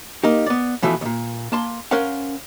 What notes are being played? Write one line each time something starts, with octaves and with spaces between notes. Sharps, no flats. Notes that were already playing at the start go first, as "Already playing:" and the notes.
A#3 D#4 G4
B3 D5
B2 E3 F3 A3
D#2 A#2
A#3 A5 C6
C#4 A#4 C5 F5 F#5